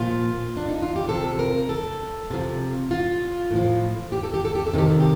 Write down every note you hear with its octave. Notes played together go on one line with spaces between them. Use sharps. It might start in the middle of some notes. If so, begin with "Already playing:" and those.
Already playing: A#2 F3 F4
D4
D#4
F4
G4
C3 F3 A4
A#4
A4
C3 F3
F4
A2 F3
G4
A4
G4
A4
G4
A4
C3 D#3 G4
A4
G4